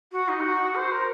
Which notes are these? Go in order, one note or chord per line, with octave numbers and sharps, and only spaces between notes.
F#4
D#4
G4
F#4
C5
A#4